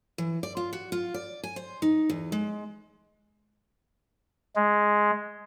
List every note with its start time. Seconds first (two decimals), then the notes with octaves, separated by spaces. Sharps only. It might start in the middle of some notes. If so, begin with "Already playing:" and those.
0.18 E3
0.43 D5
0.57 F4
0.73 F#4
0.92 F4
1.14 D5
1.43 G#5
1.56 C5
1.82 D#4
2.10 E2
2.32 G#3
4.56 G#3